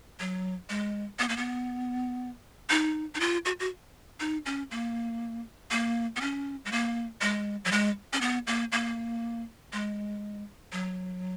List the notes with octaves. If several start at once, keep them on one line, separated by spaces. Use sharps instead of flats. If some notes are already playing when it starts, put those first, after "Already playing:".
F#3
G#3
B3
A#3
B3
D#4
D#4
F4
F#4
F#4
D#4
C#4
A#3
A#3
B3
C#4
G#3
A#3
G#3
F#3
G#3
C#4
B3
A#3
A#3
G#3
F#3